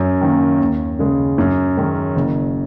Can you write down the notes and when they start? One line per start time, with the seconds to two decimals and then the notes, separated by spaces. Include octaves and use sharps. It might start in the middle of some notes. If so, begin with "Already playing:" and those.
Already playing: F#2
0.21 D#3 A#3 C#4
0.60 D#2
0.99 C#3 G#3
1.38 F#2
1.77 D#3 G#3 C#4
2.16 F#1